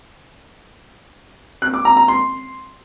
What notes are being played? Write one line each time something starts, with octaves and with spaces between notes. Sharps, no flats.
F#6
D6
A#5
A#5
C6